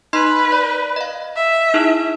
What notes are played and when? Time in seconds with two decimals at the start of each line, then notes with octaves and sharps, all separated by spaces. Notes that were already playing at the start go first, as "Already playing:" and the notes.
0.13 D#4 B4 D#5 C6
0.52 D5
0.96 D#5 F5
1.36 E5
1.74 D#4 E4 G#4